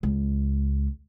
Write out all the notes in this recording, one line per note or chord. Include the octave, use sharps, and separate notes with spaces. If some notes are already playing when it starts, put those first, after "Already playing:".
C#2